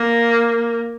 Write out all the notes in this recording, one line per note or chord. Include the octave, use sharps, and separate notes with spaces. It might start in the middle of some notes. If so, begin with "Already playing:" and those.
Already playing: A#3